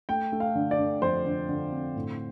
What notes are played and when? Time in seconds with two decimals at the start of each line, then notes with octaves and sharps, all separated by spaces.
0.09 A3 G5
0.32 A3
0.40 F5
0.55 D3
0.71 D5
0.79 D3
1.02 F2 C5
1.26 D3
1.49 D3
1.72 C4
1.96 A2